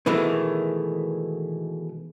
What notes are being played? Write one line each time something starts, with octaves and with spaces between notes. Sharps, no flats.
B2 D#3 E3 G#3 A3